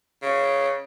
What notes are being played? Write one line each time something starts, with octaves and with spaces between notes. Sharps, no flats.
C#3